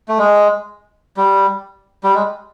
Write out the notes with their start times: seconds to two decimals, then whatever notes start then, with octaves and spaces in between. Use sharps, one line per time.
0.08 A3
0.19 G#3
1.17 G3
2.04 G3
2.15 G#3